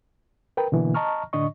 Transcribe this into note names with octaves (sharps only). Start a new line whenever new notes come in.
A#4 B4 G5
B2 D3 E3 A#3
D#5 A5 A#5 C#6 F6
A2 D3 D4 D#5 C#6